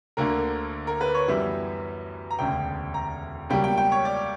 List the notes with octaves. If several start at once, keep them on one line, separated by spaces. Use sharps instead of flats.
D2 D3 A#3 A#4
A#4
B4
C#5
F#2 E3 G3 B3 E5
A#5
E1 D2 C#3 G5
A#5
C#2 B2 G3 A#3 G5
G5
G5
C#5
D5